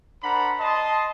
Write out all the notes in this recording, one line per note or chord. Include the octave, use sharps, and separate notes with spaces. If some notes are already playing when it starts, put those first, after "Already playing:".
D4 A#4 C5 F#5 A#5 B5
D#5 A5 C6